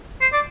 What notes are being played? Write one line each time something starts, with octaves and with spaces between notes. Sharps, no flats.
C5
D5